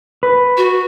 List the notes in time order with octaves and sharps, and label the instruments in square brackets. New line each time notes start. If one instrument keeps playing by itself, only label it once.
[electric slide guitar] B4
[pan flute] F#4